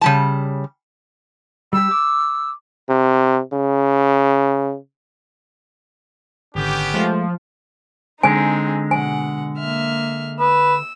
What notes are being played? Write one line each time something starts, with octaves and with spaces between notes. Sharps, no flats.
C#3 G3 A5
G3 G4 E6
D6
C3
C#3
G#1 D3 B3 C#4 G4
F3 G#3 A3
D3 G#3 C4 D#4 G#4 G#5
B2 F#5 G#5
A#3 E5 F6
B4 E6